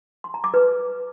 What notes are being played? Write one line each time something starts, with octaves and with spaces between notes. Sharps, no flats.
C6
A#5
D6
B4